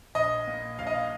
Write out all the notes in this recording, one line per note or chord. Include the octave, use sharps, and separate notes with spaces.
A#1 D#5
A#2
A#1 F5
D#5
F5